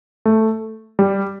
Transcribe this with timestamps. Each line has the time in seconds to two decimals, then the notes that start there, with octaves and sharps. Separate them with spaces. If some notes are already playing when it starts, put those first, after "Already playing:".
0.25 A3
0.99 G3